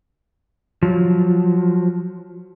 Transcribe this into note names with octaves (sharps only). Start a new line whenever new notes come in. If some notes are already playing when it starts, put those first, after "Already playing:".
F3 F#3